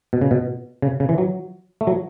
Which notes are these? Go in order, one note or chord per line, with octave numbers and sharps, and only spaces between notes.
B2
C#3
B2
C#3
C#3
E3
F#3
A3
F#3